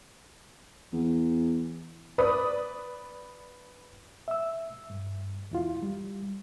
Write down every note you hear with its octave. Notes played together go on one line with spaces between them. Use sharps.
E2
B4 D5 B5 D#6
E5 E6
G2
E2 E4 F4
G3